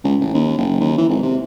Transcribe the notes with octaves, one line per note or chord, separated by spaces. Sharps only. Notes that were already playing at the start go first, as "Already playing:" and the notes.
C#2
A1
D#2
F#1
D#2
E3
G#1
C3